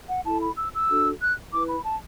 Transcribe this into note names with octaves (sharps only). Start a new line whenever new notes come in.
F#5
E4 A4 A5
B5
E6
E6
D4 F#4 A4
F#6
E4 B4 D6
B5
A5